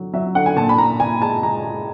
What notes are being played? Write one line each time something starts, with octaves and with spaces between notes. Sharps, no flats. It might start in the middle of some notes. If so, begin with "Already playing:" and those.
Already playing: D3 F#3
F#3 E5
D3 F#5
G#5
A#2 A5
B5
A#2 A#5
A#2 G#5
G#3 A5
G#3 A#5
G#3